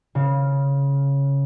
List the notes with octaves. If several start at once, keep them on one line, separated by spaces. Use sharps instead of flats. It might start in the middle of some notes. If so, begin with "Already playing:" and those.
C#3